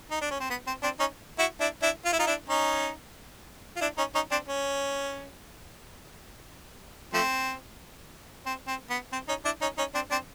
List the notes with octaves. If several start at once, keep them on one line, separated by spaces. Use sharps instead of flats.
D#4
D4
C#4
C4
B3
C4
C4 D4
C#4 D#4
E4 F#4
D4 E4
D4 E4
F4
E4
D#4 F4
D4 E4
C#4 D#4
F4
D4 E4
C#4 D#4
C#4 D#4
C4 D4
C#4
F3 A3 C4
C4
C4
B3
C4
C#4 D#4
D4 E4
C#4 D#4
C#4 D#4
C4 D4
C4 D4